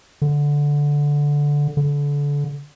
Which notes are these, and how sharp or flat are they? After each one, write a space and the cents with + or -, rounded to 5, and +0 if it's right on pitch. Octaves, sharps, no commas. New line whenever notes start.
D3 -10
D3 -30